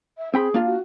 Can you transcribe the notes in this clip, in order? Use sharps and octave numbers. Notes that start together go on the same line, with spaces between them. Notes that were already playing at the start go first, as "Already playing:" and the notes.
E5
C4 G#4 G5 B5
A#3 D4 F4
F#4